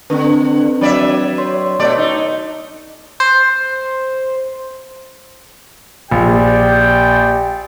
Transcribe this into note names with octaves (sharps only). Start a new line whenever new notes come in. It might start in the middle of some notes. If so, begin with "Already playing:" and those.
D3 C4 D4 B4
F#3 D5 E5
C#5 C6
B2 A3 D5
D#4
C5
A#1 G4 D5 G5